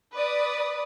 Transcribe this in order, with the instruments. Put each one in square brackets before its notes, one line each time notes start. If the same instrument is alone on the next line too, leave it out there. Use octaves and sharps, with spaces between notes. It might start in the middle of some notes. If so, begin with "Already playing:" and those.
[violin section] B4 D5 D#6